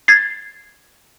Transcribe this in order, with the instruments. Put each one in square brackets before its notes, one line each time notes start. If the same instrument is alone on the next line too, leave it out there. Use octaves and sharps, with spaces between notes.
[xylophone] G#6 A6 C7